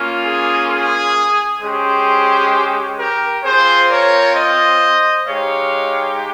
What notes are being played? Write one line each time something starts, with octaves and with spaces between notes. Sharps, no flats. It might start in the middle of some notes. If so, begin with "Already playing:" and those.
Already playing: A#3 C#4 F4
G#4
G#4
G#3 C#4 G4 G#4 C5
G4 A#4
C4 F4 G#4 C5
A#4 C#5
C5 D#5
G#3 D#4 G4 C#5 F5